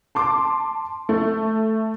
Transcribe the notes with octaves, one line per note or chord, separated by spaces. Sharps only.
A5 C6 D6
A3